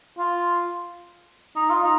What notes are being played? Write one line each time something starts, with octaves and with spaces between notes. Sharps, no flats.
F4
D#4
F4
D#4